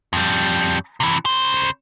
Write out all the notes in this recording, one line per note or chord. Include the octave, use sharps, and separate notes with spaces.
F2 G3
C3 E3
C#3 C5